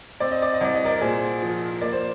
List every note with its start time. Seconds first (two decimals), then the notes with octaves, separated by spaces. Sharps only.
0.20 C4 D5
0.32 D#5
0.42 D5
0.54 D#5
0.61 C2 D5
0.75 D#5
0.85 A#4 D5
1.01 A#2 G#4 C5
1.42 F3
1.81 A#3 D5
1.92 C5